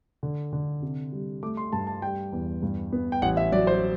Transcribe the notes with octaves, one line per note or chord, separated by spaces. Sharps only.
D3
D3
C3
G3
A3 D6
C6
G2 A5
A5
G3 G5
E2
G2
B3
G5
A1 F#5
E5
F#3 D5
C5